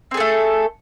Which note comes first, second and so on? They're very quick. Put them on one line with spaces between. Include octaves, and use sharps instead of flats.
C4 G#4 A4 A3